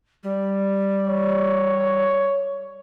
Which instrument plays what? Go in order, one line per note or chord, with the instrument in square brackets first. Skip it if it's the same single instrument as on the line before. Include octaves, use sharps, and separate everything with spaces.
[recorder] G3
[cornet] C#5